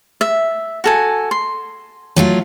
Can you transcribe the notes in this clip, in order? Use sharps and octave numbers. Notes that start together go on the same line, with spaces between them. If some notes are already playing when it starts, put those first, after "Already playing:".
E5
F#4 A4 G#5
C6
F#3 A3 F4